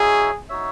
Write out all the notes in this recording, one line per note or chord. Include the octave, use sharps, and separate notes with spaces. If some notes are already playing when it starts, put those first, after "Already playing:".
Already playing: D#4 F#4 G#4 C#5 E5
D#4 F#4 C#5 E5